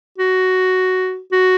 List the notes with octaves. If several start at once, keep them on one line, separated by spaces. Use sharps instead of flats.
F#4
F#4